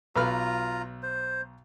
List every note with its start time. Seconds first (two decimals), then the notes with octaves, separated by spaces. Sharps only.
0.16 B1 F4 B4 A#5 F6
1.03 C5